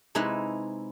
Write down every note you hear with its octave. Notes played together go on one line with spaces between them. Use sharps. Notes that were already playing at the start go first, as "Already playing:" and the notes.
C3 G#3 D#4 E4 B4 E5